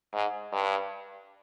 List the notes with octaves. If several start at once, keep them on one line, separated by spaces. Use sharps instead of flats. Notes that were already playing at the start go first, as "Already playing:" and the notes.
G#2
G2